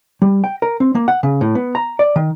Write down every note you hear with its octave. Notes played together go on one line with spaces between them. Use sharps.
G3
G5
A#4
C4
A#3
F#5
C#3
A2
B3
A#5
D5
D#3